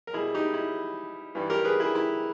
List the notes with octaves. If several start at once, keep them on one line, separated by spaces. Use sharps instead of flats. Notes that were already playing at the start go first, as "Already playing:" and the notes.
A#4
B2 G3 E4 G#4
D#4 G4
E4
G2 E3 G3
G4 A#4
G#4 B4
E4 G#4
E4